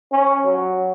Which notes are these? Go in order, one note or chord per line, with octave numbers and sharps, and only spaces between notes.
C#4
F#3